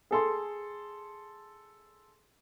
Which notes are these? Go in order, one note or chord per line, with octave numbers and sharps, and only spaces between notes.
G#4 A4 C6